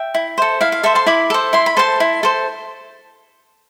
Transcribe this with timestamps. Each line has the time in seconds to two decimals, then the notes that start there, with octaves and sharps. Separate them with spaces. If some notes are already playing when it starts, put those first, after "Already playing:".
Already playing: E5 G5
0.14 E4
0.38 A4 C5
0.61 E4 F5
0.72 F5
0.83 A4 C5 E5
0.95 A5 C6
1.06 E4 B5 D6
1.30 A4 C5
1.53 E4 C6
1.66 B5
1.77 A4 C5 A5 C6
2.00 E4
2.23 A4 C5